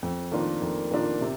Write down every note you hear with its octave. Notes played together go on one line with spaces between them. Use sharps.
F2
D#3 A#3 D4 F4
F2
D#3 A#3 D4 F4
C3